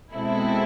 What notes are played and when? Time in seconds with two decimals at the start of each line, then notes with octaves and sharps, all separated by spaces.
0.13 B2 G#3 C4 E4 A4